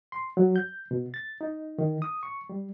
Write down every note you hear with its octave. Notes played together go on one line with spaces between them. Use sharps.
C6
F#3
G6
B2
A6
D#4
D#3
D#6
C#6
G3